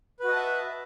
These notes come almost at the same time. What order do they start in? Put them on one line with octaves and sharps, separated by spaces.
B4 F#4 D#5 A5 E5